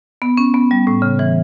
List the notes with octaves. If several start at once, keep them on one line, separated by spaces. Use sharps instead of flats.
B3
C#4
B3
G3
A2
C#3
E3